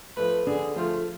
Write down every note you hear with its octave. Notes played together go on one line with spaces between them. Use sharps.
F3 A3 B4
D3 G#4
F3 A3 F4